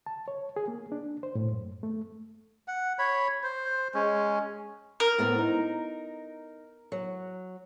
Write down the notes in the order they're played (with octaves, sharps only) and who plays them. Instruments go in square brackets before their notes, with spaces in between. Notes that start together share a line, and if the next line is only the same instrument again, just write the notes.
[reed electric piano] A5
C#5
G#4
A#3
D4
C5
A2
F#2
A3
[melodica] F#5
C#5 B5
C5
G#3 C#4
[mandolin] A#4
[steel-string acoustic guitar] A2 B3 C4
D#4
F#3